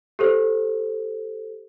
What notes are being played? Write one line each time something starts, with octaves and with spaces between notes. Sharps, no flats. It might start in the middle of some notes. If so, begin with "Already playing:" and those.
G4 A4 C5